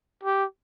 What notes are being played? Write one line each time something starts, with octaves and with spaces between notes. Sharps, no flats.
G4